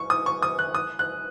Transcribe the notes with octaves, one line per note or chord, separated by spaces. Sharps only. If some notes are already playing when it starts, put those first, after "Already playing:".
Already playing: C#6
D#6
C#6
D#6
F#6
D#6
F#6